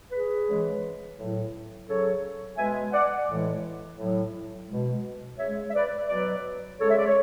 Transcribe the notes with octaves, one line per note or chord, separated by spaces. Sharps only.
G#4 B4
C#3 E3 G#3
A2 F#3
C#3 F#3 A4 C#5
B2 G#3 E5 G#5
D5 F#5
A2 E3 G#3
A2 F#3
B2 G#3
C#3 G#3 C#5 E5
E5
B4 D5
B2 F#3 B4 D5
C#3 G#3 A4 C#5
E5
D5
C#5